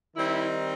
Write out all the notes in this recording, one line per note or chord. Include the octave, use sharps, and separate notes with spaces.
D#3 G3 C4 D#4 E4